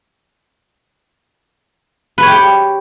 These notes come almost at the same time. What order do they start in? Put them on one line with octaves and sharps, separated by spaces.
B4 C#5 G4 G5